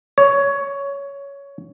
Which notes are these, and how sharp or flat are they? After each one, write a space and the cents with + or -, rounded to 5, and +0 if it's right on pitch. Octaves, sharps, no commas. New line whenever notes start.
C#5 +15